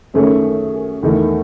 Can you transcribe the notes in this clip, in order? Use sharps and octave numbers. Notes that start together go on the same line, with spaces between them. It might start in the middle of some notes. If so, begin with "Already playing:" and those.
F#2 D#3 A3 C#4 G#4
E2 D#3 A3 D#4